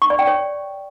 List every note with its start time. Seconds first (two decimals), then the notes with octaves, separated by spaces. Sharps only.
0.02 C#6
0.10 D5
0.19 G5
0.27 C#5